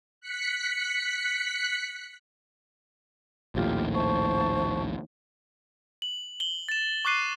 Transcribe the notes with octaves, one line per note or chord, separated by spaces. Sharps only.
F#6 B6 C#7
A#1 D#2 A2 F4 G4
C5 A5 C#6
F#7
F#7 G7
A6 E7
C#6 D6 F#6 C7 D#7